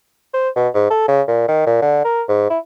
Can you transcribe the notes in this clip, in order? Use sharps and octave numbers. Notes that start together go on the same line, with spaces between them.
C5
B2
G#2
A4
C#3
A#2
D#3
A#2
D3
A#4
G#2
E4